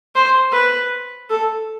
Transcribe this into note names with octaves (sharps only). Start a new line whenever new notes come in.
C5
B4
A4